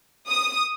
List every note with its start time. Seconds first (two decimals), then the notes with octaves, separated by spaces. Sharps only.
0.28 D#6